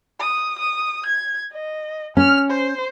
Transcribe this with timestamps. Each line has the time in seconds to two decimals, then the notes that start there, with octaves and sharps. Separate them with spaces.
0.20 D#6
0.58 D#6
1.06 G#6
1.52 D#5
2.17 C#4 F6
2.50 C5